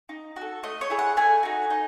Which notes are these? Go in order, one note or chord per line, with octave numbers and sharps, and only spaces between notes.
D#4
F#4 A4
A3 D#5
C#5
E4 G#4
F#5
A3 G#5
D#4 F#4
D#4